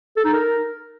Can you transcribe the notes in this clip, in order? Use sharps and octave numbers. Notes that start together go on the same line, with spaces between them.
A4
D#4
A#4